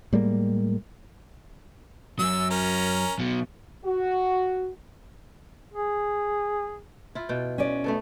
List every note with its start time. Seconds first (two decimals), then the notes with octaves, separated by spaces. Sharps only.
0.13 A2 G3 G#3 A#3
2.19 F#2 F#3 E6
2.50 C#4 A#4
3.19 B2 F#3
3.85 F#4
5.74 G#4
7.15 E4 F4
7.29 B2 G5
7.58 C#4 B4 D5
7.84 A3 B3 A4